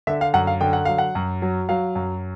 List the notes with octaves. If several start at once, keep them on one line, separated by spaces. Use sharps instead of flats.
D3 E5
F5
F#2 F#5
F5
D3 G5
F#5
F#3 F5
F#5
F#2
F#3
F#3 F5
F#2